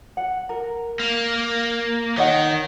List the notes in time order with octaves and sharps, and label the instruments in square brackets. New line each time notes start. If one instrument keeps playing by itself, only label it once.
[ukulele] F#5
A#4
[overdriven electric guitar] A#3
[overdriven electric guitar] D#3 [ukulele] C#5 D#5 F#5